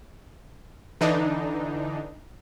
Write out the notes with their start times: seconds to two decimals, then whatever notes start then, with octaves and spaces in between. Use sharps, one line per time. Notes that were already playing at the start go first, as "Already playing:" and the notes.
1.01 D3 E3 D4 D#4